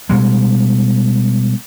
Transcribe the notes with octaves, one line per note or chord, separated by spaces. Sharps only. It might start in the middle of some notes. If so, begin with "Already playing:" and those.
B2 G3 G#3